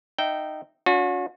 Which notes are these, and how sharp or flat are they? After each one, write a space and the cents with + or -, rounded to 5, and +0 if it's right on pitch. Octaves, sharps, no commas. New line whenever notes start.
D#4 -15 E5 +0 G5 -15
C#4 +45 F#4 -40